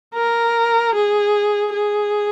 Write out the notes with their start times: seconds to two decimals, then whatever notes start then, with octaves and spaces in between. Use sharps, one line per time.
0.15 A#4
0.95 G#4
1.74 G#4